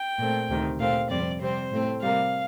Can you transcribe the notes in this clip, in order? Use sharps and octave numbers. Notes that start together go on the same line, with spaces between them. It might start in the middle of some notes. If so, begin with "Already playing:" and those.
Already playing: G5
A#2 A3 C4
D2 C3 D#3
A#2 A3 C4 F5
F2 C3 G3 C4 D5
C3 G3 C4 C5
A2 A3 C4
C3 G3 A#3 F5